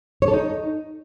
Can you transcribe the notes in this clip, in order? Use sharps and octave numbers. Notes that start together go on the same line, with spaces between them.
C#5
A4
D#4